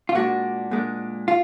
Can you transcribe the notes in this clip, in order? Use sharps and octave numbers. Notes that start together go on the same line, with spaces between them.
F4
A#2 G#3 D4 F#4
A#2 G#3 D4
F4